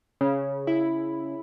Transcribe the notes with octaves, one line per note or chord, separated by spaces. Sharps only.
C#3
E4